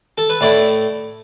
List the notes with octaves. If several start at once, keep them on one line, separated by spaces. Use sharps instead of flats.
A4
B4
A2 A3 E4 D5